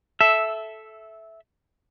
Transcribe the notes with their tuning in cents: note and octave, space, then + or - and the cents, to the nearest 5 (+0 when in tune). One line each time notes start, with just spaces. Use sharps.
A4 -15 E5 +0